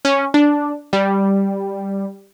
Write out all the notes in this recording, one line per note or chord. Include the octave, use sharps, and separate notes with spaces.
C#4
D4
G3